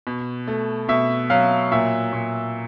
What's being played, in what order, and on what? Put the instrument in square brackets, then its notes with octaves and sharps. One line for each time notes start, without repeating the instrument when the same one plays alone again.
[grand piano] B2
A3
B2 E5
F#3 F5
A#2 E5
A#2